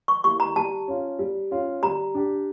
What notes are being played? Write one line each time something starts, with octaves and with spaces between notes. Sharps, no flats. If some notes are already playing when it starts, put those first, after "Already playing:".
C#6
G3 A#3 E4 C#6
A#5
G3 A5
C#4 F4
G3
C#4 F4
G3 A#5
D4 G4